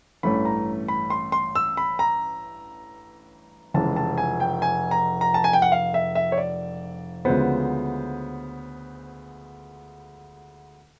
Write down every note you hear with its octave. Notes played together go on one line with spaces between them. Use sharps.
A1 G2 E3 A3 C#4 B5
A#5
B5
C6
C6
E6
B5
A#5
F1 F2 C#3 E3 G#3 A5
A5
G#5
G5
G#5
A#5
A#5
A5
G#5
G5
F#5
F5
E5
E5
C#5
D5
D2 C#3 F3 G#3 B3 C5